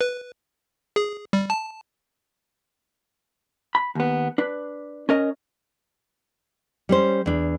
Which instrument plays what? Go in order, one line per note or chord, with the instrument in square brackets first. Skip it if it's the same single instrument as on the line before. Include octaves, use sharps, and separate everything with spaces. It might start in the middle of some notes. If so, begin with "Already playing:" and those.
[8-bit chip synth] B4
G#4
G3
A5
[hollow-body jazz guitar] B5
D#2 B3
D4 B4
C#4 A#4 D#5
[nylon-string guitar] G3 C#4 C5
E2 D4